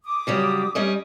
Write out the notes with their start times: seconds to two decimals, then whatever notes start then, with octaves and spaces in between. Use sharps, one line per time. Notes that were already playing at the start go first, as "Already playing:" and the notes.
0.04 D6 D#6
0.27 C#3 F#3 G3
0.75 G3 C#4 D#5